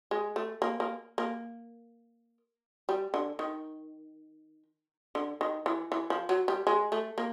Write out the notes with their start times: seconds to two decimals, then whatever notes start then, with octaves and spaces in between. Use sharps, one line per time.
0.11 G#3
0.36 A3
0.62 A#3
0.80 A#3
1.18 A#3
2.89 G3
3.14 D3
3.39 D#3
5.15 D3
5.41 D#3
5.66 E3
5.92 E3
6.10 F3
6.29 F#3
6.48 G3
6.67 G#3
6.92 A3
7.18 A#3